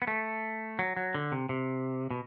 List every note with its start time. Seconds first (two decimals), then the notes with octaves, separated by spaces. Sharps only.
0.02 B3
0.07 A3
0.79 F#3
0.97 F#3
1.14 D3
1.32 C3
1.49 C3
2.11 B2